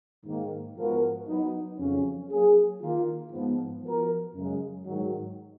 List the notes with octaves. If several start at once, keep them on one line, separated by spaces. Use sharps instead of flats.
G#2 D#3 A#3
G#2 F3 B3 F#4 A#4
F#3 B3 D#4
F2 C#3 F#3 C#4
F#3 A#3 C#4 G#4
D#3 A#3 F4
G#2 F3 B3
F3 B3 F#4 A#4
F#2 C#3 G#3
G#2 D#3 F#3